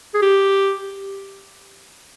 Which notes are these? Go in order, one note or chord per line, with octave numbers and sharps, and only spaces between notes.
G#4
G4